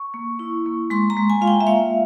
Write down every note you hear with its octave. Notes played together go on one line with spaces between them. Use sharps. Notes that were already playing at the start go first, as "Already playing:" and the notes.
Already playing: C#6
A#3
E4
A#3
G#3 C6
A#5
G#3
G#5
F4 F5
G5
E5
A#3 F5